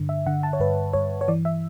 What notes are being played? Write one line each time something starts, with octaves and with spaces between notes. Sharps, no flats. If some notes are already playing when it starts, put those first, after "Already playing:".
Already playing: G2 D3
E5
D3 F#5
A5
C#5
G2 B4
G2 C#5
C#5
E3 D5
E5